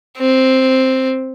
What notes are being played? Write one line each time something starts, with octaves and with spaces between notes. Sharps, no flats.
C4